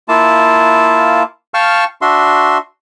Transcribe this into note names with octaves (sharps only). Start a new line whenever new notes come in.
A#3 E4 F4 A5
F5 G5 A5 C#6 F6
D4 F#4 E5 C6